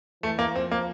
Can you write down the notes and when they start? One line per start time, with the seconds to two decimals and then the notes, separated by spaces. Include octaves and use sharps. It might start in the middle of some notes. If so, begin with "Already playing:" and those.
0.23 E3 A3
0.39 A#3
0.55 F3 C4
0.71 A#3